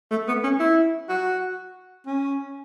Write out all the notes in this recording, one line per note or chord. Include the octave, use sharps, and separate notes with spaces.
A3
B3
C#4
E4
F#4
C#4